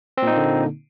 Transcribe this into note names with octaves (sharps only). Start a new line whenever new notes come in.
A#2 D3 A#3 C4 D#4